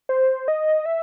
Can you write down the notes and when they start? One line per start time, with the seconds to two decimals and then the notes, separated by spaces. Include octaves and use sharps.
0.09 C5
0.48 D#5
0.86 E5